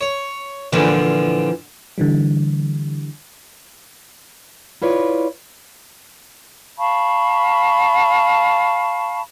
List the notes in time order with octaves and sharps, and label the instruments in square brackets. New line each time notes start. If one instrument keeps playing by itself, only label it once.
[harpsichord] C#5
[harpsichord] A#2 D3 [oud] E3 F3
[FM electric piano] D3 E3 G3
[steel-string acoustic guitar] E4 F4 B4 C#5 D5
[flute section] F5 A5 B5 C#6